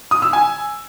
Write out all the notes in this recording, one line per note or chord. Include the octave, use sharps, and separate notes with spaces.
D#6
E6
G#5